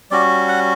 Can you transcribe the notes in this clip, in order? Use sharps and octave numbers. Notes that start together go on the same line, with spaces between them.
G3 C#4 F#4 D5
F#5